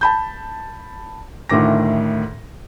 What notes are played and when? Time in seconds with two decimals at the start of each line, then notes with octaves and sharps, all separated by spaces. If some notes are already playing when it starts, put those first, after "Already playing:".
0.01 A5 B5 G6
1.49 D2 A2 D#3 D6 A#6